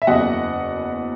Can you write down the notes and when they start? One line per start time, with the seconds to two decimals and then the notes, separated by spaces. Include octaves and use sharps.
0.02 E5
0.07 F#1 E2 C#3 F#3 D#5 F#5